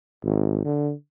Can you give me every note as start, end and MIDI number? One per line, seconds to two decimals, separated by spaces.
0.24 0.60 32
0.65 0.93 50